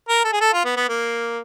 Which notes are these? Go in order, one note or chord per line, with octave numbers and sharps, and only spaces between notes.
A#4
A4
G#4
A4
F4
B3
B3
A#3